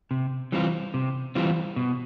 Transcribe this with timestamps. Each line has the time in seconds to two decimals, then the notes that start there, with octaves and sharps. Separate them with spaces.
0.11 C3
0.52 E3 G3 C4 F4
0.94 C3
1.35 E3 G3 C4 F4
1.76 B2